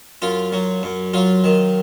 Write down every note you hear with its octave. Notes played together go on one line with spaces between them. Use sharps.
F#2 F4
F#3
F#2
F#3 F4
D#3